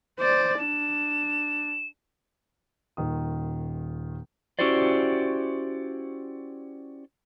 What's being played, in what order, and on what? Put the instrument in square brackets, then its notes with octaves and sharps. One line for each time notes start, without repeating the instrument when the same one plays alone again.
[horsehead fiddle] C5 D5
[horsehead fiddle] D4 [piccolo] E7
[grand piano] D#1 D#3 D#6
[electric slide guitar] C#4 E4 F#4 G4 C5 D5